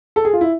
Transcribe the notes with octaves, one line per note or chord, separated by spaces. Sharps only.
A4
G#4
F4
E4